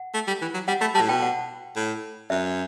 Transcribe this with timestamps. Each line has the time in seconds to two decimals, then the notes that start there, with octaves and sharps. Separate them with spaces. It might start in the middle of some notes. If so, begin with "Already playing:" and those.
Already playing: F#5
0.14 A3
0.27 G3
0.41 E3
0.54 F#3
0.68 G3 F#5
0.81 A3 B5
0.94 G3 A5
1.01 A2
1.09 B2 G5
1.23 F#5
1.76 A2
2.30 F#2 E5